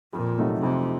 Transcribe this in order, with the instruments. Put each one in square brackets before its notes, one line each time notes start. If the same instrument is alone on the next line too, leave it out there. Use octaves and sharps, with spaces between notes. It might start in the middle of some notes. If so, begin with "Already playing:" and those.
[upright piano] F2 [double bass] A#2
[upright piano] C3 F#3 A3 D#4
[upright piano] F2 [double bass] C3